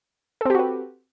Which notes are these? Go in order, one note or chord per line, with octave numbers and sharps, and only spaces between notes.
C4 F#4 G4 A4 B4